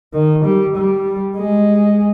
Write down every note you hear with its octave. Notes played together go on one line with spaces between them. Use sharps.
D#3
G3
G3
G#3